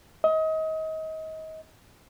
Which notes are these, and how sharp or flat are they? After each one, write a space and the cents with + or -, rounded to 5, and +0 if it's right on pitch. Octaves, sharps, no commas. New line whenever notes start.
D#5 +30